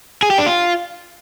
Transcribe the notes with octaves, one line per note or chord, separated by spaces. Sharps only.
G#4
G4
D4
F4